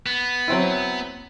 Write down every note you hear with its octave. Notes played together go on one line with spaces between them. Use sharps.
B3
F#3 C4 E4